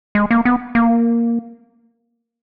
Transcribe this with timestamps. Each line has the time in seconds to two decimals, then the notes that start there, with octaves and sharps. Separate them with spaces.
0.15 G#3
0.31 A#3
0.45 B3
0.75 A#3